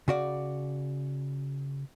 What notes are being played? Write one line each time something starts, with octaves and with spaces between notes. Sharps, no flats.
C#3 F#4 D5